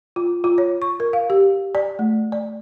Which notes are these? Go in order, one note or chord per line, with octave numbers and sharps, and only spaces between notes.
F4
F4
C#5
C#6
A#4
F5
G4
D5
A3
D5